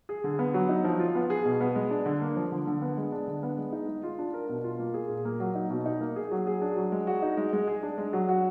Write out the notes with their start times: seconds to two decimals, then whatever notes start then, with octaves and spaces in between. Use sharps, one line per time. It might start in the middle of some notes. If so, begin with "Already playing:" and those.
0.09 G#4
0.24 D3
0.39 B3
0.54 F#3
0.69 D#4
0.84 F3
1.00 F4
1.15 B3
1.30 G#4
1.45 B2
1.61 B3
1.75 G#3
1.91 D4
2.06 D3
2.22 A#3
2.36 F3
2.52 D3
2.67 D3
2.82 B3
2.97 G#3
3.12 D4
3.27 D3
3.43 B3
3.58 G#3
3.73 D#4
3.88 G#3
4.03 F4
4.19 D4
4.34 A#4
4.49 B2
4.64 F4
4.79 A#3
4.94 G#4
5.09 A#2
5.25 A#3
5.40 F#3
5.55 D#4
5.70 B2
5.86 D#4
6.01 A#3
6.16 G#4
6.31 F#3
6.47 G#4
6.61 D4
6.77 F#3
6.92 G#3
7.07 F#4
7.22 D#4
7.37 G#3
7.53 G#3
7.67 G#4
7.83 D4
7.98 G#3
8.13 F#3
8.29 F#4